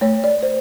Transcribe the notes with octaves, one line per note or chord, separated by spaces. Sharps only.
A3 C#5
D5
C5